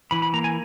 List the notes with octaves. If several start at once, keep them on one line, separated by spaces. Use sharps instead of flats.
E3 B5
B5
A#3 A#5
G#5